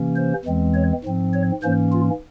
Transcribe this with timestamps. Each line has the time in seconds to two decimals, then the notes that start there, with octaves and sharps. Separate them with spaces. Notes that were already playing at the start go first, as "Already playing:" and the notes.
Already playing: C3 E3 A#3 C#4
0.16 C5
0.45 E2 E3 G#3 C4
0.74 C#5
1.04 G#2 F3 C4
1.33 C#5
1.63 G#2 E3 A#3 C#4 C5
1.92 F4